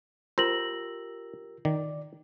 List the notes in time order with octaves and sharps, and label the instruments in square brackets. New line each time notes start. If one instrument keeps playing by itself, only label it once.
[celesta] F4 A#6 F#7 [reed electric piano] G4 A#4 E6 [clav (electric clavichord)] C5
[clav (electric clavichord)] D#3 [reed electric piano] D5